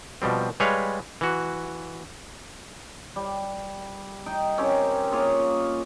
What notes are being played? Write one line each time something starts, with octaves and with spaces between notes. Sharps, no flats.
B2 F3 G3 C4
G3 G#3 B4 C#5 F5
E3 F#4
G3
D#4 G5
C4 C#4 G4 A#4
A#3 F4 G#4 C#5